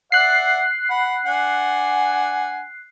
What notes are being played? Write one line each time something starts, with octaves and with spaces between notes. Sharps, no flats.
D5 E5 F#5 F#6 C7
F#5 B5
D4 F#5 G#5